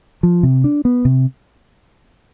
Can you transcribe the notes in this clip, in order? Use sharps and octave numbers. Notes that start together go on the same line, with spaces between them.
F3
C3
D4
B3
C3